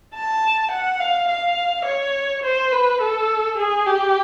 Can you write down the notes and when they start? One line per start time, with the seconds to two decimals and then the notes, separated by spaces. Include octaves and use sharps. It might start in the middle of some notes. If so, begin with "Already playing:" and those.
0.14 A5
0.71 F#5
1.00 F5
1.28 F5
1.85 C#5
2.43 C5
2.71 B4
3.01 A4
3.58 G#4
3.86 G4